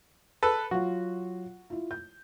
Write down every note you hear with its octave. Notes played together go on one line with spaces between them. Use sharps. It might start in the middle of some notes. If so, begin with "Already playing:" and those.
A4 B4
F#3 F4 F#4
E4 F4
G6